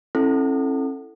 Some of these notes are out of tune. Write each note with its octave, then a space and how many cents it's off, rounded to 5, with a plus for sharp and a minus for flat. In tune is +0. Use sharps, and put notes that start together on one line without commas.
C#4 -45 E4 +0 A4 +0